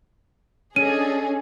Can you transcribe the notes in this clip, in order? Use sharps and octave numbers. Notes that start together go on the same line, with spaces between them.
C#4 D4 G#4 A4 D#5 D#7